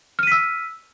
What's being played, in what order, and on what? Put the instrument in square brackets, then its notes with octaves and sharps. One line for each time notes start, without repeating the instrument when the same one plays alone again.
[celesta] F6
D#7
B6
E6